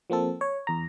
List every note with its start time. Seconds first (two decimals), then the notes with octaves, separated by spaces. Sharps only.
0.10 F3 A#3 C4 A4
0.41 C#5
0.67 E2 A#5